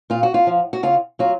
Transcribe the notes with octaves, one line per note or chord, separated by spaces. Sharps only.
A#2 F4
F#4
F4
F3
F#4
C#3 F4
F#3 F4